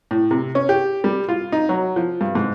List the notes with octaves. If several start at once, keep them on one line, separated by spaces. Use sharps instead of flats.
A2
C3
C#4
G4
G3
F4
D#4
F#3
F3
G2
G#2